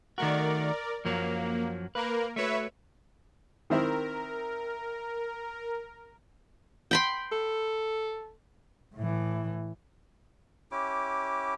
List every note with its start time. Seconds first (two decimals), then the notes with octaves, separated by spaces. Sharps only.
0.18 D#3 A3 F#4 A#4 D5
1.05 F#2 F3 F#3 A#3
1.95 A#3 A#4 B4
2.36 A3 F#4 B4 C#5 E5
3.70 D#3 C4 E4 A#4
6.91 G5 B5 C6
7.32 A4
8.95 A2 E3
10.71 C#4 E4 G4 D6